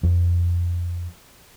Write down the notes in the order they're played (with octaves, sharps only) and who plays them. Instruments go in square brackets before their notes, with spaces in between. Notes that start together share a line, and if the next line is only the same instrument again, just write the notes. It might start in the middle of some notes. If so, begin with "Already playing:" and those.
[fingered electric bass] F2